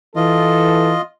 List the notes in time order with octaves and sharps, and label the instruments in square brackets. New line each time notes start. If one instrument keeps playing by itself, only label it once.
[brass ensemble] E3 A4 [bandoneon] F4 D#5